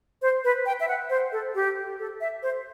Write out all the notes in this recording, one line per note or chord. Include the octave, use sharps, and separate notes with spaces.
C5
B4
G5
E5
F#5
C5
A4
G4
A4
E5
C5